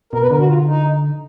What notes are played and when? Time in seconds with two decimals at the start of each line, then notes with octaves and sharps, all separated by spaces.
0.13 B2 A#4
0.22 B4
0.31 D3 A#4
0.39 F#4
0.48 F4
0.66 D#4